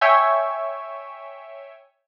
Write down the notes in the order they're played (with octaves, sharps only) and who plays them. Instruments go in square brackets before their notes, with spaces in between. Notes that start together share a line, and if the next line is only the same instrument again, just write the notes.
[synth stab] C#5 E5 G5 G#5